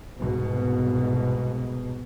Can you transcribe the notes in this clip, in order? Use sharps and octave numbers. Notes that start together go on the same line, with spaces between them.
C2 G#2 B2